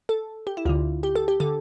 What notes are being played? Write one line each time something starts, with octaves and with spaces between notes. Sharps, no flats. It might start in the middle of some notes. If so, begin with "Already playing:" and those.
A4
G4
E4
D2 D3 F4
G4
A4
G4
D3 A4